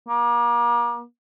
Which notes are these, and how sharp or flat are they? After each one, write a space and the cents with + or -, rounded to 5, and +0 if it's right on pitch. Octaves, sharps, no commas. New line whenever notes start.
A#3 +35